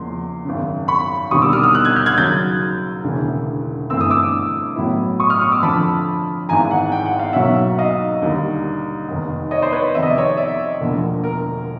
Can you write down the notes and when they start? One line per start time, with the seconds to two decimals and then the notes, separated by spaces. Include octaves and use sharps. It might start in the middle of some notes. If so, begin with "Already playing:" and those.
Already playing: E2 C#3 F3 A#3 C6
0.45 G#1 F#2 C#3
0.88 B5 C#6
1.31 E1 D#2 D3 G3 C4 C#6 D#6
1.42 D6 E6
1.53 D#6 F6
1.63 D#6 F6
1.74 E6 F#6
1.85 F#6 G#6
1.96 F6 G6
2.06 F#6 G#6
2.17 D#2 C#3 F#3 G6 A6
3.04 E1 D2 C#3 E3
3.90 G1 G2 E3 A3 C4 E6
4.01 D#6
4.11 D6 E6
4.76 A1 A2 F#3 B3 E4
5.20 C#6 D#6
5.30 D#6 F6
5.41 C#6 D#6
5.51 D6 E6
5.63 F2 D3 F3 A5 B5
6.49 G#1 G#2 E3 G#5 A#5
6.71 F#5 G#5
6.92 G5
7.06 F#5
7.19 F5
7.33 B1 B2 F#3 A#3 C#4 E5 F#5
7.79 D#5 F5
8.22 D#2 D3 G3 A#3
9.09 F1 D#2 D#3
9.51 C#5 D#5
9.62 C5 D5
9.72 B4 C#5
9.95 F2 C3 D#3 E5
10.03 D#5
10.10 D5
10.18 C#5 D#5
10.37 D5 E5
10.81 E1 D2 D3 F3 A#3
11.24 A#4